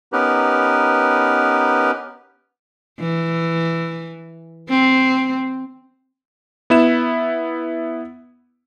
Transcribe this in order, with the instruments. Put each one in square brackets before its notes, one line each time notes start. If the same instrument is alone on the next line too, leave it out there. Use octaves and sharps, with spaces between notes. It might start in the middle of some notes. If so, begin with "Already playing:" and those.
[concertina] B3 C#4 D#4 G4 A#4 B4
[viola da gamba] E3
C4
[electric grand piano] B3 E4 E7